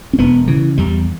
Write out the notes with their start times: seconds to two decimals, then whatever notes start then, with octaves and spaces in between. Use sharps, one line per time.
0.13 C#4
0.19 E1 B3
0.48 C#3 E3
0.78 E2 G3